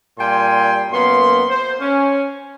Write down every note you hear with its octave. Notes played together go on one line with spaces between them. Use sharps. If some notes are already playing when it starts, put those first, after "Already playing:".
A#2 G3 G5 G#5 C6
F#2 A#3 B3 C6
C5
C#4